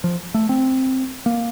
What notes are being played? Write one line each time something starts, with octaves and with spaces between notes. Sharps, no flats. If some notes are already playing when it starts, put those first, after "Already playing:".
F3
A3
C4
A#3